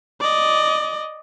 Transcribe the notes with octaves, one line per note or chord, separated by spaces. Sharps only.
D5 D#5